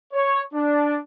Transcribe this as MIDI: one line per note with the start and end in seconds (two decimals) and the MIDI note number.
0.13 0.41 73
0.53 0.97 62